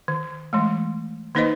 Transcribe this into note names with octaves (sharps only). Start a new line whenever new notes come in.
D#3
E3 G#3 A3
D#3 A#3 D#4 B4 C5 D#5